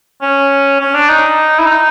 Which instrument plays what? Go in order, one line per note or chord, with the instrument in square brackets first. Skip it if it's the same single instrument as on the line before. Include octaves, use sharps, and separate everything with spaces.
[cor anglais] C#4
C#4
D4
D#4
E4
D#4